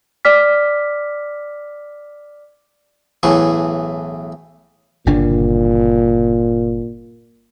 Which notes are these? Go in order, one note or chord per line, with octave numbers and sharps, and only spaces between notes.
D5 D6 F6 B6
B1 A2 E3 G#4 C#6
G1 A#2 C#3 D4